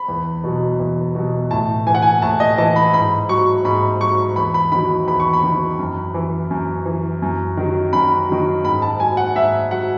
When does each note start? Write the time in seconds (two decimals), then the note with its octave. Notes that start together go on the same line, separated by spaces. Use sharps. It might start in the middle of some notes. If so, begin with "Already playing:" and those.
Already playing: B5
0.08 E2
0.44 B2 F#3
0.80 E2
1.15 B2 F#3
1.51 A2 A5
1.87 E3 G#5
1.95 F#5
2.02 G#5
2.22 A2 A5
2.40 D#5
2.58 E3 A5
2.76 B5
2.94 G#2 B5
3.29 F#3 C#6
3.65 G#2 B5
4.01 F#3 C#6
4.36 E2 B5
4.54 B5
4.72 D#3 B5
4.76 F#3
5.08 E2 B5
5.20 C#6
5.33 B5
5.43 D#3 F#3
5.79 F#2
6.14 E3
6.51 F#2
6.86 E3
7.22 F#2
7.57 D#3 F#3
7.93 F#2 B5
8.28 D#3 F#3
8.64 G#2 B5
8.82 A5
9.00 F#3 G#5
9.17 F#5
9.35 G#2 E5
9.71 F#3 F#5